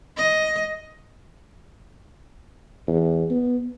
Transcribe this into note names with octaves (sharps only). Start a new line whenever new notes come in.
D#5
E2
B3